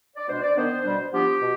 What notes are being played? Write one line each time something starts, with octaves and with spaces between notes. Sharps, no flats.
D5
B2 G#3 D4 C5
D5
D#3 B3 D4 C5
B2 G3 D4
F3 B3 D4 G4
B2